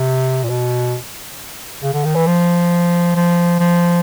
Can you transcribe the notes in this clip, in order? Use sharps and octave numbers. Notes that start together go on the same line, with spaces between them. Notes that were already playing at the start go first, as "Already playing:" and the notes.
Already playing: C3
A#2
B2
C#3
D3
D#3
E3
F3
F3
F3